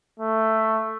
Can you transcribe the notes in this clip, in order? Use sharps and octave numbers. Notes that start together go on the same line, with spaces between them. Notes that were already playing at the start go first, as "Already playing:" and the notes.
A3